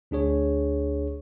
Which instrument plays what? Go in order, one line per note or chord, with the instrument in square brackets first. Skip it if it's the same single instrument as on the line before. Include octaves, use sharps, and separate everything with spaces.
[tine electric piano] D2 D4 G#4 C#5